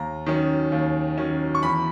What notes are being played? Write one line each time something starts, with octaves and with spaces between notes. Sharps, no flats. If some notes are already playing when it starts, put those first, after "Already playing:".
Already playing: D#2 A#5
D#3 F#3 C#4
D#2
D#3 F#3 C#4
C#6
E2 B5